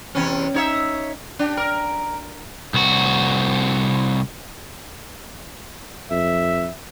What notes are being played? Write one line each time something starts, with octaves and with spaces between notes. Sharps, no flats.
E2 C3 C#4
D#4 C#5 E5
D4 G4
A#4
C2 F#4
F2 E5